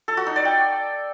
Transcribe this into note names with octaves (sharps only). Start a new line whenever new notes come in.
A4
F#4
D#4
D5
G5